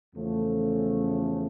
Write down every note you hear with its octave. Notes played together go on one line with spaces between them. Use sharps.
E2 C#3 F3 A3 C#4